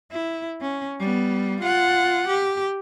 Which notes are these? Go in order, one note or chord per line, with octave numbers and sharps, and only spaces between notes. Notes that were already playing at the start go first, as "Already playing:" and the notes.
E4
C#4
G3 B3
F4 F#5
G4